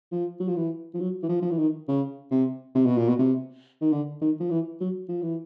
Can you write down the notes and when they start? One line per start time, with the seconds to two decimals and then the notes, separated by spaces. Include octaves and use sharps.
0.12 F3
0.40 F#3
0.48 F3
0.56 E3
0.94 F3
1.00 F#3
1.23 E3
1.29 F3
1.42 F3
1.51 E3
1.59 D#3
1.88 C#3
2.31 C3
2.75 C3
2.86 B2
2.98 A#2
3.09 B2
3.19 C3
3.81 D#3
3.93 D3
4.21 D#3
4.40 F3
4.51 E3
4.81 F#3
5.09 F3
5.22 E3